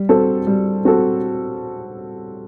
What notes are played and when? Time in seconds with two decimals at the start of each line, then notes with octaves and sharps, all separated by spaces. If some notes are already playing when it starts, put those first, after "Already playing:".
Already playing: G3
0.09 C4 F#4 A4
0.47 G3
0.85 C4 F#4 A4